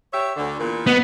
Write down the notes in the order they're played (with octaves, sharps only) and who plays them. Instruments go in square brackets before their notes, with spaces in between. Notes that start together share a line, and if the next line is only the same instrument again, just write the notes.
[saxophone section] G4 C#5 E5
D2 D3
E2 A#2
[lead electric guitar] B3 [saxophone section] B4 D#5 F#5